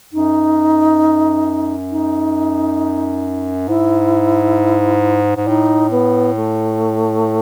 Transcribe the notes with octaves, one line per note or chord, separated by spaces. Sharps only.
F#2 D#4
D#4
G#2 E4
G#2
A2 D#4
B3
A3